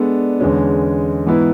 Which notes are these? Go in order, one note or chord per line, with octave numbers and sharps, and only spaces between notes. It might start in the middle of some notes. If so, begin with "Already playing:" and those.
Already playing: G#3 B3 D4 A4 D5
E2 D3 G#3 C#4
G#2 E3 B3 E4 B4